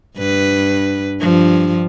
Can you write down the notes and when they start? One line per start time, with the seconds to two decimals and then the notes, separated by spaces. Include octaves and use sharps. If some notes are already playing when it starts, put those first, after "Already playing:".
0.17 G2 B4
1.20 G2 F3